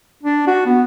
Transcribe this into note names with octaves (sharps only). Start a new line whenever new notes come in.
D4
F#4
B3